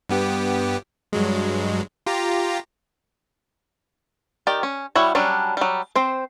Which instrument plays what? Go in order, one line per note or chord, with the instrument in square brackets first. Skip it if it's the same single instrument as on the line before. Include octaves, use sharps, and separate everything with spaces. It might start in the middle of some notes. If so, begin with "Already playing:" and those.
[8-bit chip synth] G2 B3 G4
G2 F#3 G#3
F4 G4 A#5
[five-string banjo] D#3 G4 D5
C#4
G3 E4 F#4 C#5
F#3 G3 C#4 D4
F#3 G3
C4 C5